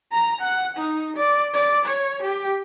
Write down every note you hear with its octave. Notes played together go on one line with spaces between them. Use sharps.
A#5
F#5
D#4
D5
D5
C#5
G4